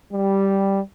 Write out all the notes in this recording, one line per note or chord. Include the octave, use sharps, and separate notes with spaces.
G3